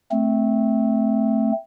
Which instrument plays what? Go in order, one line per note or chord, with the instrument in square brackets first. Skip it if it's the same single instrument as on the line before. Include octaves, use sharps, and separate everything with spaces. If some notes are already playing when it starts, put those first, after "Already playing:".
[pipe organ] A3 C4